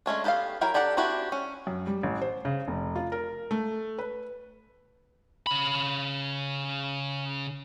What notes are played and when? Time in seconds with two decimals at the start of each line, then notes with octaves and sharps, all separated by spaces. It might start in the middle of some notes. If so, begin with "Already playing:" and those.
0.06 G#3 A3 C#4 D4
0.24 B3 G4 A4 D#5 F5
0.61 F#3 E4 A#4 G5
0.74 D4 G4 A4 D5 F#5
0.97 C4 D4 E4 F#4 G4
1.32 C#4
1.67 F#2
1.87 G3
2.03 A1
2.21 C5
2.45 C#3
2.68 F1
2.95 F4
3.12 A#4
3.51 A3
3.98 B4
5.47 C#3 B5